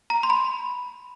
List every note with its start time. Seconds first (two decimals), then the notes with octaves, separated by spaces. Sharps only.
0.10 A#5
0.23 C6
0.30 B5